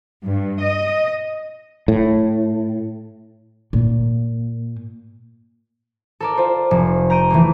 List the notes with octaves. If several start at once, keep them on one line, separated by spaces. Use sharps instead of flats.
G2
D#5
A2
A#2
A4 A#4 D5
F4 C5
F1
A#5 G6 D7 D#7
E3 A3 A#3